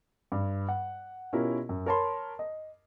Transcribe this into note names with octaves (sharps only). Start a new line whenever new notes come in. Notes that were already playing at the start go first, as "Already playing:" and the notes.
G2
F#5
B2 C#4 E4 F4 G4 A#4
F#2
A#4 C#5 A5 B5 C6
D#5